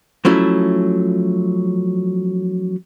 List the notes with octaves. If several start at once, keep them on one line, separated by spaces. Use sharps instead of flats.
F3 F#3 A3 C#4 E4